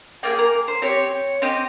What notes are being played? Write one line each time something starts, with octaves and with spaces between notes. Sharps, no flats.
A#3 F4 G#4 G5
A#4
C5
C4 G4 C#5
C4 G4 D#5